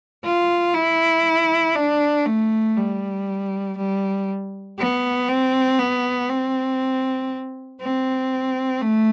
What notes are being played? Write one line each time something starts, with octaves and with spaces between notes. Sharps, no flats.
F4
E4
D4
A3
G3
G3
B3
C4
B3
C4
C4
A3